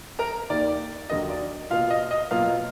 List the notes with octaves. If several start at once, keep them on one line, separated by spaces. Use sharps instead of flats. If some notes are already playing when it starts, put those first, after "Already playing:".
A#4 A#5
D#2 D#3 A#3 D5
D#2 D3 F#3 A#3 D#5
D5
B2 A#3 F4 F5
D#5
D#5
B2 F#3 A#3 F4 F5